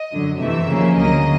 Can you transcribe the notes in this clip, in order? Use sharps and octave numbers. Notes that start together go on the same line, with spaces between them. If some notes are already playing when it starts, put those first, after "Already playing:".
Already playing: D#5
F#2 D3 F#3
F2 C3 E3 A3 E5
D#2 C#3 F3 A#3 C#4
D2 C#3 F#3 A#3 D#5